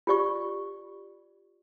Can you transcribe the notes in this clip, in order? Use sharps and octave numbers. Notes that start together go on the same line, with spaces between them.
F4 G4 D5 C#6